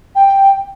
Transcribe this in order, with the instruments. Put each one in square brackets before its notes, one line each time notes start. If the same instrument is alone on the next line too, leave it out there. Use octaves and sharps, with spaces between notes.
[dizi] G5